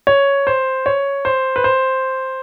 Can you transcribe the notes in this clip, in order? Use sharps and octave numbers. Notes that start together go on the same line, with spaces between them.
C#5
C5
C#5
C5
B4
C5